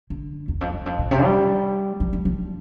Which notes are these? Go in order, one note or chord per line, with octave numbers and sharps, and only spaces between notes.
D3
E2
F2
E2
F2
A2
C3
G3
F3
F3
F3